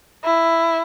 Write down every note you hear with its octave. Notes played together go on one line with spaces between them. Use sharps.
E4